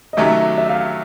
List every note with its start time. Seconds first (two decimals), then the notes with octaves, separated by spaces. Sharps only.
0.13 D#5
0.17 C3 D#3 F#3 A3 C#4 E5
0.58 E5
0.69 F5